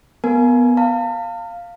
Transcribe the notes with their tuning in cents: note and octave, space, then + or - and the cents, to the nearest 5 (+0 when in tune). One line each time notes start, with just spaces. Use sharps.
B3 +0 A#4 +0 G#5 +25
F5 +0 A5 +45